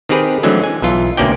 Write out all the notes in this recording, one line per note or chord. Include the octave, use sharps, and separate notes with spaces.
D#3 C4 G4 G#4 B4
D3 E3 F#3 G#3 A3 C4
G#5
B1 E3 F4
D2 B2 A#3 C#4 D5 G5